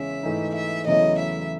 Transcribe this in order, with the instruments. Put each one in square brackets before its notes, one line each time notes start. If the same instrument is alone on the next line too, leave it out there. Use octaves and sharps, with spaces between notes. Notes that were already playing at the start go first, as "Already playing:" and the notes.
Already playing: [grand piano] E2 C#3 G#3 C#4 [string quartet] E5
[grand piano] G#2 E3 A3 D#4
[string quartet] E5
[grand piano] E2 C#3 F#3 A3 E4 [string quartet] D#5
[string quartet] E5